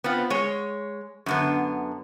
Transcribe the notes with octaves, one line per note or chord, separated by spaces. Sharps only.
B3 C4 F4
G#3 C#5
F#2 D3 B3